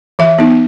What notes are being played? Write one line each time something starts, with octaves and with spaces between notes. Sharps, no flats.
E3 E5
B3 D#4